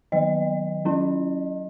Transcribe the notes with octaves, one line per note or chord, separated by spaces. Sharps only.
D#3 F#3 B3 D#5
F#3 C#4 E4